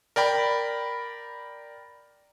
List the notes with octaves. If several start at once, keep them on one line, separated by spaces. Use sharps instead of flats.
A#4 D5 G5 B5